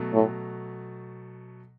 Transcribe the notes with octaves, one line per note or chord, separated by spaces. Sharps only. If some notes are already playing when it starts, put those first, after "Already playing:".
Already playing: B2 F#3 A3
A2